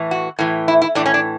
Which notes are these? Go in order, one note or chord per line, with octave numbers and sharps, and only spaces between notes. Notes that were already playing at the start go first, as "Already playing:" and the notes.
Already playing: A2 E3
F#4
A2 E3
E4
E4
A2 E3 D4
C#4
D4